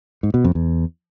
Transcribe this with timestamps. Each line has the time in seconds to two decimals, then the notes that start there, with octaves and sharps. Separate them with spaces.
0.23 G#2
0.34 B2
0.44 F2
0.55 E2